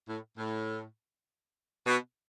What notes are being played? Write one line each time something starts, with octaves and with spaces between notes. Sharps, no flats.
A2
A2
B2